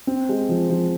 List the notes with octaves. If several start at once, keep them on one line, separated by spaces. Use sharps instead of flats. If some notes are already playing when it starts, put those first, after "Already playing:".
C4
G#3
F3
F3